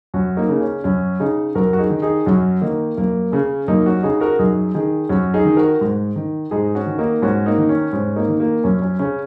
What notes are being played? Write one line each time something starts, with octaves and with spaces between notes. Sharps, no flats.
F#2 C#4 F#4
A#3 D#4
C#3
C#4
F#2 C#4 F#4
C#3 D#4 G#4
F#2 F#4 A#4
F#4
D#4 G#4
D#3
D#4 G#4
F#2 C#4 F#4
D#3 A#3 D#4
F#2 A#3
C#3 C#4
F#2 A#3 D#4
C#4 F#4
C#3 D#4 G#4
F#4 A#4
F#2 D#4 G#4
D#3 D#4 G#4
F#2 C#4 F#4
D#4 G#4
D#3
F#4 A#4
G#2
D#3
G#2 D#4 G#4
C#4 F#4
D#3
A#3 D#4
G#2 C#4 F#4
A#3 D#4
D#3
C#4
G#2 C#4
A#3 D#4
D#3
A#3
F#2 C#4
C#4
C#3 C#4